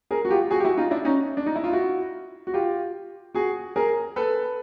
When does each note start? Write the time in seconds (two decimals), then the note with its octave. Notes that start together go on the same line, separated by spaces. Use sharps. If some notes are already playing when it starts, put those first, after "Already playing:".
0.11 G#4 A#4
0.25 F#4
0.30 F4 G4
0.51 F#4 G#4
0.60 G4
0.64 E4 F#4
0.77 D#4 F4
0.91 D4 E4
1.05 C#4 D#4
1.37 D4
1.46 D#4
1.56 E4
1.64 F4
1.73 E4 F#4
2.47 F#4
2.54 F4 G4
3.35 F#4 G#4
3.76 G#4 A#4
4.16 A4 B4